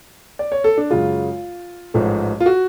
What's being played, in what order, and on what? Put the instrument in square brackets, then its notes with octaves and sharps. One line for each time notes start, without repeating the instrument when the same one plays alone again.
[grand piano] D5
C#5
A4
D4
F#2 C#3 G#3 F4
A1 G#2 F3 A3
F4
F#4